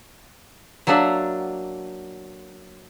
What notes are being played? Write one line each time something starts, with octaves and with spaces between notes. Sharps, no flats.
F#3 A#3 D4 E5 F#5